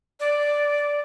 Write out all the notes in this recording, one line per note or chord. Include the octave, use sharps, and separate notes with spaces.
D5